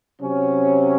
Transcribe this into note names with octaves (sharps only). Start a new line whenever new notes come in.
C3 F#3 C#4